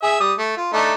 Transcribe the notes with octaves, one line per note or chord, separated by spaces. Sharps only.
G#4 E5
G3 D#6
A3
F4
A3 D4 D#4